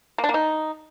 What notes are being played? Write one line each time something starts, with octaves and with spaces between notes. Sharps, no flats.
A#3
D4
A#3
D#4